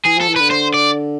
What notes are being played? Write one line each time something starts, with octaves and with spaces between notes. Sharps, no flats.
E3 G#4
F3 A4
E3
D3 B4
C5
D5